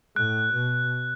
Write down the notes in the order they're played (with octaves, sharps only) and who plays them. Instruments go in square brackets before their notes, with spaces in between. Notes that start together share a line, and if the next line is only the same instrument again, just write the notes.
[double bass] A2 [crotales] F#6
[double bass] B2